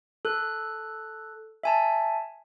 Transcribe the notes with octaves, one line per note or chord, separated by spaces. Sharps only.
A4 F#6
E5 G#5 A5